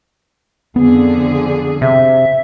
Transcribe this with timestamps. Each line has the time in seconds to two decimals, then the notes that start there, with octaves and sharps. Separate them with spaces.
0.76 F2 D3 B3 G#4
1.81 C3 E5